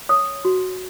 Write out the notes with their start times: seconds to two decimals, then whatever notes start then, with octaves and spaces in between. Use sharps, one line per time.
0.09 C#5 D#6
0.45 F#4